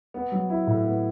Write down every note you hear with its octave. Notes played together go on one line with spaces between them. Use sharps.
B3
F#3
E4
A2
B3